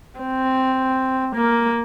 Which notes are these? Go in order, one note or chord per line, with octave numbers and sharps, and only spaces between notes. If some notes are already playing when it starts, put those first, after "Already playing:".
C4
A#3